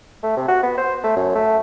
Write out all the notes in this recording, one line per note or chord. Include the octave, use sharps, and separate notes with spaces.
A3
C3
F#4
B3
C5
A3
F#2
A3